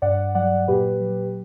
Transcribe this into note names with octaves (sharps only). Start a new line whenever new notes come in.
G2 D5 F#5
F#3 D5 F#5
A#2 G4 B4
F#3